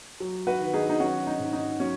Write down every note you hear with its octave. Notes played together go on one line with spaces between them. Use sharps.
F#3
F#4 B4
D#3
D#4 G#4
D#4
F#3 C#4 F#4
D#4
G#2
D#4
F#3 C#4